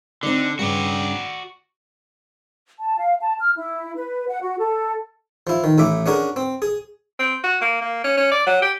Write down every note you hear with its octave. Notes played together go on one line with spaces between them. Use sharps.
D3 C4 D#4 D5
G2 C#3 F#4 D5
A5
F5
A5
F6
E4
B4
F#5
F#4
A4
F3 E4
D#3
A1 A2 E5 D6
C#4 D4 F#4 G#4 A#4
C4
G#4
C4
F#4
A#3
A#3
C#4
C#4
D5
F#3
G4